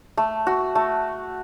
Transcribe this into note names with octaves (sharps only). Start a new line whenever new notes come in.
A3
F#4
A3